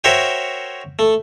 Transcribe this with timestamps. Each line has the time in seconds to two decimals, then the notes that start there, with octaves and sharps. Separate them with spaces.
0.04 F#4 A#4 C5 C#5 E5 G5
0.99 A3